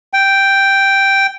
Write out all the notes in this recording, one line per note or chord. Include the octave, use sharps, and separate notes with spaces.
G5